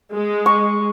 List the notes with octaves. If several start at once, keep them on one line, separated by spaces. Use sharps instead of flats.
G#3
C#6